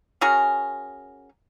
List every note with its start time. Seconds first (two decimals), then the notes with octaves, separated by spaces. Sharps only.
0.21 C#4 F#4 G#4 A#4